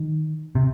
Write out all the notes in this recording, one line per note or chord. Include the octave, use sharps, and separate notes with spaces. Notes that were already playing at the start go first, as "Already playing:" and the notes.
Already playing: D#3
C3